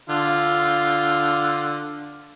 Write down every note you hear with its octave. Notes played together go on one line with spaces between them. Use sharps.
D3 F4